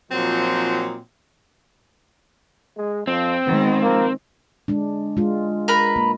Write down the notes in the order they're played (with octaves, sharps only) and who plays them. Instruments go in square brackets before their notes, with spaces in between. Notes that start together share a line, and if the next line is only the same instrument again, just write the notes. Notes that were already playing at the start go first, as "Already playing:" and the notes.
[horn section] A#2 F3 F#3 C4 D#4 C5
[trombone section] G#3
[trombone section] F2 F3 [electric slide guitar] C4
[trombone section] G#1 B3 [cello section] D#3 G#3
[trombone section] F3 A#3
[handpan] G#3 D4
G#3 F4
[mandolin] A#4 B4 B5
[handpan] A#3